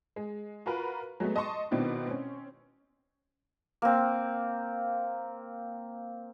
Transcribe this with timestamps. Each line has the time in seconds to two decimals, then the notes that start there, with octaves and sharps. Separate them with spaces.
0.16 G#3
0.66 F4 F#4 A#4 B4
1.20 F#3 G#3 A3 B3
1.36 D#5 A5 C6 C#6
1.71 B2 D#3 B3 C4 D4 E4
2.07 C4 C#4
3.82 A#3 C4